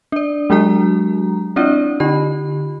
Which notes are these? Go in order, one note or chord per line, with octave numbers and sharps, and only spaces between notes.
D4 D5
F#3 G#3 D4 F#4 A#5
C4 D4 E4 F4 D5
D3 F4 G4 B5